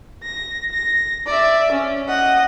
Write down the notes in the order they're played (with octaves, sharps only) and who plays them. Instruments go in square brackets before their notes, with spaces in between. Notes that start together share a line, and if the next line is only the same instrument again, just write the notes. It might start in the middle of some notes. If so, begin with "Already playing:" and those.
[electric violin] A#6
A#6
D5 E5
C#4
D#5 F#5